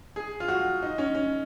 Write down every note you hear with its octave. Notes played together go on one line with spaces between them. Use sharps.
G#4
F4
F#4
D#4
C#4
C#4